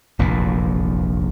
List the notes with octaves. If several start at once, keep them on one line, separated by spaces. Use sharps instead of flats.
F1 A#1 E2 A#2